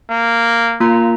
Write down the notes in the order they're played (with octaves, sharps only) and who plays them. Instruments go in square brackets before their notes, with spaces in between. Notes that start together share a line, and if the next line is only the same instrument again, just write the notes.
[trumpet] A#3
[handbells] A#3 F4 A#5